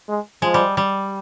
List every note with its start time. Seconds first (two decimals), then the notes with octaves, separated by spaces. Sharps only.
0.08 G#3
0.42 F3 G#3
0.54 G3
0.77 G3